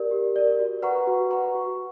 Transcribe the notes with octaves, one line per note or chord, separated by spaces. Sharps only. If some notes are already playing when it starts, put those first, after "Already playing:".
Already playing: G4 A#4 D5
G4
A#4 D5
F#4
B4 F#5 A#5 C#6
F#4
B4 F#5 A#5 C#6
F#4